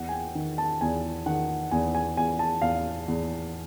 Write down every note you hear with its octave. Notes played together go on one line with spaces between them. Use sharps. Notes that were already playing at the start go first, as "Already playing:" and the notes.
Already playing: E2 F#5
G#5
G5
D#3
A5
E2 G#5
D#3 F#5
E2 G#5
G#5
E2 G#5
A5
E2 F5
E2